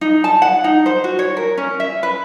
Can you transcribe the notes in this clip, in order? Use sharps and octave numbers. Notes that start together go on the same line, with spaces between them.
D#4
A5
F#5
D#4
C5
F#4
C#5
A#4
C#4
E5
B4